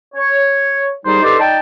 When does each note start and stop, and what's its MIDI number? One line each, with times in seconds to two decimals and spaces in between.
0.14 0.91 73
1.05 1.20 39
1.05 1.20 55
1.05 1.20 63
1.05 1.20 68
1.05 1.20 72
1.22 1.36 63
1.22 1.36 67
1.22 1.36 69
1.22 1.36 71
1.22 1.36 72
1.22 1.36 74
1.39 1.60 63
1.39 1.60 74
1.39 1.60 79
1.39 1.60 81